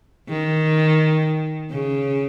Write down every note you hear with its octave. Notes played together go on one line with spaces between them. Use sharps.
D#3
C#3